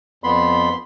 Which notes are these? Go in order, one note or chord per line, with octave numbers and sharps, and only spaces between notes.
F2 B3 B5 C6